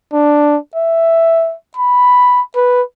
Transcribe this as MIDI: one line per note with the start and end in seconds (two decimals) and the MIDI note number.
0.13 0.58 62
0.76 1.55 76
1.77 2.41 83
2.56 2.82 71